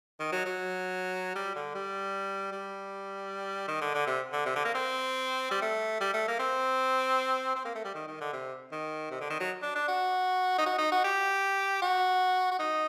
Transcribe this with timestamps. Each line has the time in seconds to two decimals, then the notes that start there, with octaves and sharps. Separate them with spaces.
0.19 D#3
0.32 F#3
0.45 F#3
1.36 G3
1.55 D3
1.75 G3
2.52 G3
3.68 D#3
3.81 D3
3.94 D3
4.07 C3
4.33 D3
4.46 C3
4.55 D3
4.65 A#3
4.75 C4
5.51 G3
5.62 A3
6.01 G3
6.14 A3
6.28 A#3
6.39 C4
7.55 C4
7.65 A#3
7.75 A3
7.85 G3
7.95 D#3
8.07 D#3
8.21 D3
8.33 C3
8.72 D#3
9.11 C3
9.21 D3
9.30 D#3
9.40 F#3
9.62 D4
9.76 D4
9.88 F#4
10.58 D#4
10.66 F#4
10.78 D#4
10.92 F#4
11.04 G4
11.82 F#4
12.51 F#4
12.59 D#4